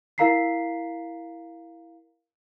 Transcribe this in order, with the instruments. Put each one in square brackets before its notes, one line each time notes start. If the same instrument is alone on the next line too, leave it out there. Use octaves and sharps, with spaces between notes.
[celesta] E4 A#4 F5 A#5 B6 C7